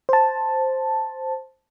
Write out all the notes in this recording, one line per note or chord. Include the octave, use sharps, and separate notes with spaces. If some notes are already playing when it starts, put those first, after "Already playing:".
C5 A5